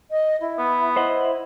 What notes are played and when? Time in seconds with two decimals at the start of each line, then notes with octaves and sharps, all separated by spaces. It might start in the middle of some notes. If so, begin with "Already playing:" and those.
0.11 D#5
0.41 E4
0.58 B3
0.96 E4 C5 D#5 F#5